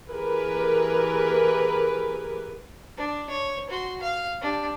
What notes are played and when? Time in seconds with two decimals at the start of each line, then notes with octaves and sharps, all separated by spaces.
0.11 E3 G4 G#4 A#4 B4
2.97 D4
3.30 C#5
3.70 F#4 C6
4.01 F5
4.41 D4 G4